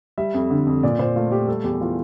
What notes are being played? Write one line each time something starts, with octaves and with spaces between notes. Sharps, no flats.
G3 E5
F2
D3
F2
A#2 D5
A#2 C5
A3 F4
A3 G4
G3 A4
E2 G4
E3 F4